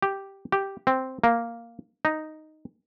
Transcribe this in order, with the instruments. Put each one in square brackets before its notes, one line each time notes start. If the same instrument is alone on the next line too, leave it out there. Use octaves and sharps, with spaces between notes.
[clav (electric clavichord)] G4
G4
C4
A#3
D#4